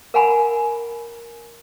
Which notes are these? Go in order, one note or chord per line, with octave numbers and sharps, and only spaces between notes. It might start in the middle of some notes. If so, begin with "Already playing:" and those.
A#4 F5 F#5 G#5 A#5 B5